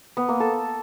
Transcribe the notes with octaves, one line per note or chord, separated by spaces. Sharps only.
B3
A#3
A4